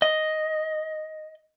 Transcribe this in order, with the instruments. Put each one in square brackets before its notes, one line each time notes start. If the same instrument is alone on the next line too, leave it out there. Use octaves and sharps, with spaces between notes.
[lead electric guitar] D#5